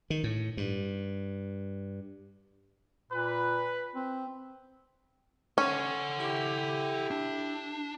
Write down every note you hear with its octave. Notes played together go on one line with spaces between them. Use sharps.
D#3
A2
G2
A#2 B4
C4
C#4 A4 F#5
E4 G4
D4